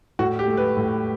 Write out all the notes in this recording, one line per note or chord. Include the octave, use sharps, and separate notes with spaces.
A2 F#4
G4
A3
B4
A2